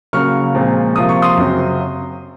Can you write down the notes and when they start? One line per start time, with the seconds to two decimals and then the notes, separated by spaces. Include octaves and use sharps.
0.13 C#3 F#3 A#3 C#6 F6
0.54 A#2 F3 G#3 C4
0.95 C3 F3 A#3 D#6
1.09 C#6
1.22 C6 D#6
1.37 F#2 C#3 F#3 C4